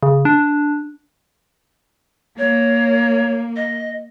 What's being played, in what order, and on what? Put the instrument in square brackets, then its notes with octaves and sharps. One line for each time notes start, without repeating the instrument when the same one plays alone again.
[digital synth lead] C#3
D4
[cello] A#3 [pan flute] C#5
[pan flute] D#5